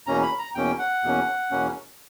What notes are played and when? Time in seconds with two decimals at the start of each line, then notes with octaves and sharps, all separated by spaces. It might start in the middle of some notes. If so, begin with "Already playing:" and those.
0.07 E2 B2 A#3 C#4 A#5
0.23 B5
0.39 A#5
0.55 E2 B2 A#3 C#4 G5
0.79 F#5
1.03 E2 B2 A#3 C#4
1.51 E2 B2 A#3 C#4